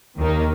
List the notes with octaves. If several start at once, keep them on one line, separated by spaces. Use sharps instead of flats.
D#2 D#3 A#3 D#4